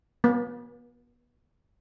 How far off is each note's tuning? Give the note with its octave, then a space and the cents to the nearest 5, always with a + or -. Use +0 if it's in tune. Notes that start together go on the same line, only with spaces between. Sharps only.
B3 -35